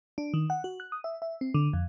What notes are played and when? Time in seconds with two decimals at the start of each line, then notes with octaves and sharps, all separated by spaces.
0.18 D4
0.34 D#3
0.50 F#5
0.64 F#4
0.80 F#6
0.92 D#6
1.04 E5
1.22 E5
1.41 C4
1.54 D3
1.73 F2